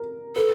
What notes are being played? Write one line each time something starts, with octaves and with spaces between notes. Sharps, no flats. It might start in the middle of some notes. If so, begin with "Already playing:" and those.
Already playing: A#4
A4 B4